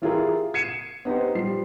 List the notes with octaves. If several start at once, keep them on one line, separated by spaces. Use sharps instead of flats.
E3 E4 F4 G4 G#4 A#4
G#6 C7 C#7 D#7 E7
B3 D#4 G4 C5
F3 G3 C7